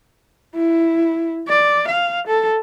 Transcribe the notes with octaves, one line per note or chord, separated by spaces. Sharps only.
E4
D5
F5
A4